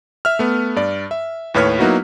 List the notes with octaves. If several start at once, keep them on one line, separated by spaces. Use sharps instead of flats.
E5 F6
A3 B3
G2 D5
E5
D#2 A2 B4 C#5 F6 B6
F#3 A#3 B3 D#4 E4 F#4